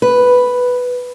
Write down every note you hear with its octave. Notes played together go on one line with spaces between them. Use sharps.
B4